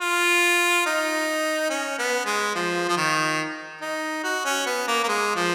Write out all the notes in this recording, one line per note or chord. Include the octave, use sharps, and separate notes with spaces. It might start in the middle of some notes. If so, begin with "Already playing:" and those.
F4
D#4
C#4
B3
G#3
F3
F3
D#3
D#4
F#4
C#4
B3
A#3
A#3
G#3
F3